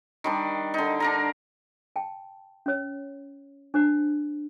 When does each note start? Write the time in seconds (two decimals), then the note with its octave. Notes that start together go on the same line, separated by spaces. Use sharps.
0.24 D#3 G3 D4
0.74 D3 D#4
1.00 D4 A#4 A#5
1.96 G5 A5
2.66 C#4 C#5
3.74 D4 C5